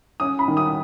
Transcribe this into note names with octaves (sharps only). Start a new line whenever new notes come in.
C#4 D#6
B5
D#3
D#6